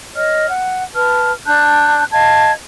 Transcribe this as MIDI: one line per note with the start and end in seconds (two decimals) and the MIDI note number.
0.15 0.50 73
0.15 0.50 75
0.15 0.50 89
0.50 0.83 78
0.94 1.32 71
0.94 1.32 81
0.94 1.32 89
1.45 2.04 62
1.45 2.04 81
1.45 2.04 90
1.45 2.04 91
2.12 2.52 75
2.12 2.52 77
2.12 2.52 81
2.12 2.52 92